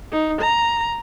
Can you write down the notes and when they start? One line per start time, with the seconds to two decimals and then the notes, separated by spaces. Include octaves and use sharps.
0.12 D#4
0.41 A#5